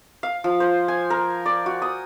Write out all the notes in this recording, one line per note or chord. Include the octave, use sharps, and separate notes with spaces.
F5
F3
C5
G#5
A#4
D5
F#4
D#6